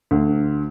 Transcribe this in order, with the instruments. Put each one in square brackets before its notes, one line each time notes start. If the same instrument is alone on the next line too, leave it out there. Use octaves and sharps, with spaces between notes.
[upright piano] D2